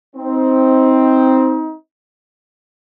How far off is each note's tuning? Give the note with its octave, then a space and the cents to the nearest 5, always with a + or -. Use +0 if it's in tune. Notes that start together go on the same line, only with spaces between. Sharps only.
C4 +0 D#4 +25